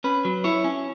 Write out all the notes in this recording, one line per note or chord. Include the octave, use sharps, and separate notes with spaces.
C#4 B4
F#3
E4 C#5
C#4